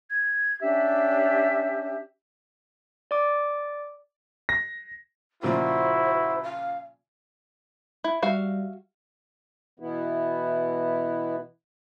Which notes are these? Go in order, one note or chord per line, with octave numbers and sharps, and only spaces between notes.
G#6
C#4 D4 G4 E5
D5 D6
A#6
A#2 C#3 F3 E4 F#4 C5
F5
E4
G3 F#4 E5 F5
B2 E3 B3 E4